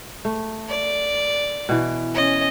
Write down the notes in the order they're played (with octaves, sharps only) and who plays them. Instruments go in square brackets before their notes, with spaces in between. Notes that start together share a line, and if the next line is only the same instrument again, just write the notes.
[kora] A3
[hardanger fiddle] D5
[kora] B2 E3
[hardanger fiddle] C#4 D#5